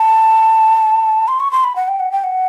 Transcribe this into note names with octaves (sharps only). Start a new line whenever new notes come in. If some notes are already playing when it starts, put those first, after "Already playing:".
Already playing: A5
C6
C#6
C6
B5
F#5
G5
F#5
G5
F#5